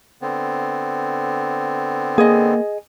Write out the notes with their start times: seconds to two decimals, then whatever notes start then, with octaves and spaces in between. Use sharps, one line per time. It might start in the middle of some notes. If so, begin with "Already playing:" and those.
0.22 D3 B3 C4
2.18 A#3 G#4 D#5